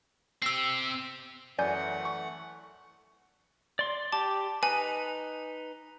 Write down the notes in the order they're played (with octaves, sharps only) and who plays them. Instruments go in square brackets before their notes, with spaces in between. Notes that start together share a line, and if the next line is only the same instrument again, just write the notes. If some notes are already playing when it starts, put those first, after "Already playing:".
[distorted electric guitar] C4 G4 [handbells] E6 C7
[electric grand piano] F#2 [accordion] E3 A3 F#5 [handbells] D5 G#5 G6
[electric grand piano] C#6
[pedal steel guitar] D5 C6
[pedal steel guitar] G4 D6 [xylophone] A5
[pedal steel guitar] D#4 B4 [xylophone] G#5